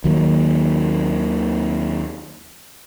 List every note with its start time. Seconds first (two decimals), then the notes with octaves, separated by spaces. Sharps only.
0.04 D#2 D#3 F#3 A#3